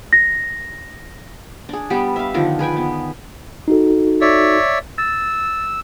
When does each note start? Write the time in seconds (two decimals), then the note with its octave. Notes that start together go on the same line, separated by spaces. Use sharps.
0.13 A#6
1.69 D4 G#4
1.90 G3 B3 G4
2.16 E5 F5
2.34 D3 D#3 F3 D4
2.59 G#4 B4 G5 G#5
2.77 B3
3.68 D#4 F#4 A4
4.21 C#5 D5 E5
4.98 E6 A6